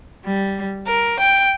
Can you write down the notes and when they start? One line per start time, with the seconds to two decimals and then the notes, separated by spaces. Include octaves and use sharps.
0.25 G3
0.86 A#4
1.18 G5